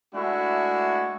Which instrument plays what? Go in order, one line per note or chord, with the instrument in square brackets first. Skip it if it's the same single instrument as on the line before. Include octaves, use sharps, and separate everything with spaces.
[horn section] G#3 A3 D4 E4 F#4